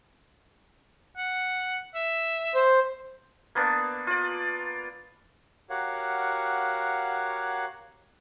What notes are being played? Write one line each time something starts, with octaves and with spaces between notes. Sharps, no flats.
F#5
E5
C5
A#3 B3 D4
F4 D5
F#4 G4 A#4 C#5 F5 F#5